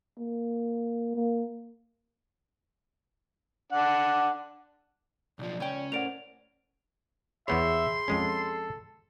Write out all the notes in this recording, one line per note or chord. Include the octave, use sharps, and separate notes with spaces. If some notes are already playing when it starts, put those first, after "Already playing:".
A#3
A#3
D4 F#5
B1 F3 D5
C#2 C#4 G5
A2 A#4 C5 D5 F#5 D7 F7
E2 B3 G#4 C#5 E5 B5 C6 G6
F2 G#3 C#4 A4